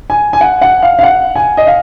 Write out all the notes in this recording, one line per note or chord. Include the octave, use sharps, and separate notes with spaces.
G#5
G#5
F#5
F#5
F5
F5
F#5
G#5
D#5
F5